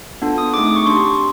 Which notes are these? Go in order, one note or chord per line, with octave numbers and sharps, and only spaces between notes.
B3 D4 F4 A4
D#6
A3 C4 D#4 G#4 D6
D#6
C#6
D4 G4 C6